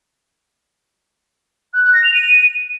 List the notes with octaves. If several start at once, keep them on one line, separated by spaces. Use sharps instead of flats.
F#6
F#6
A#6
F7
D#7